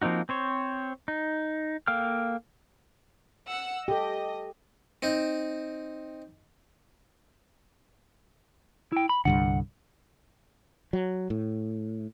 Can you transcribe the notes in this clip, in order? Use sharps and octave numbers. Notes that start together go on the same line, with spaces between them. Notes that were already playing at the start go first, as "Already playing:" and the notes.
F3 A#3 C4 D#4 F#4
C4 C5 C#5
D#4
A#3 A4 F5 G5 F6
F#5 E6
G4 A4 D#5
C4 D#4
E4 G5
B5
C2 G2 D3 F#5
F#3
A2